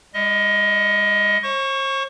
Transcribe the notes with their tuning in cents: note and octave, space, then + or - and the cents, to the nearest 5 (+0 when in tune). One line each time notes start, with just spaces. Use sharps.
G#3 -45 D#5 +20
C5 +45 C#6 +0